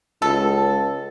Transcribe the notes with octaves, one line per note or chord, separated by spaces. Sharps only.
C#2 A4